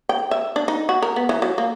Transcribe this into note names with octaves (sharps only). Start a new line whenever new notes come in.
G5
E5
D4
D#4
F#4
A#4
B3
E3
F#3
A#3